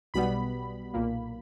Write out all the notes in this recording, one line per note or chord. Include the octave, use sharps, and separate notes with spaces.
B1 B2 G3 B3 B5
B1 A#2 A#3